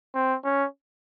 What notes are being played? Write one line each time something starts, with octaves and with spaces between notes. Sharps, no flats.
C4
C#4